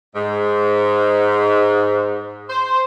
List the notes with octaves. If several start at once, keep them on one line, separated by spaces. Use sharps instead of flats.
G#2
C5